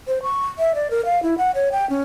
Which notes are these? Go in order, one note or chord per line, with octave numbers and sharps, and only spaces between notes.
C5
C#6
E5
D5
A#4
F5
E4
F#5
C#5
G5
C#4